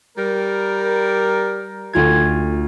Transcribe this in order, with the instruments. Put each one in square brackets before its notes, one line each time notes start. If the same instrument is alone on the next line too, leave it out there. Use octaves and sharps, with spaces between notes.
[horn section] G3 A#4
[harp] D2 F4 G#6